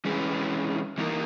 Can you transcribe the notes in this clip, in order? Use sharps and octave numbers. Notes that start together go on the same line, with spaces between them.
E3 G#3 C#4 G#4 B4
E3 A#3 D#4 A#4